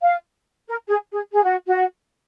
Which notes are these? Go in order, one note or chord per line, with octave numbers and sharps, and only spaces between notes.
F5
A#4
G#4
G#4
G#4
F#4
F#4